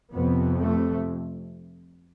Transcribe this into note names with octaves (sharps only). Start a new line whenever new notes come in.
F2 C3 B3
A3